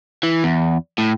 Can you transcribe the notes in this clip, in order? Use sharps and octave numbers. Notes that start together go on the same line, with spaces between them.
E3
E2
A2